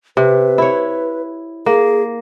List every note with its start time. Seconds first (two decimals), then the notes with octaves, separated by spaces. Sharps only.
0.17 C3 B4
0.58 E4 C#5
1.66 A#3 G#4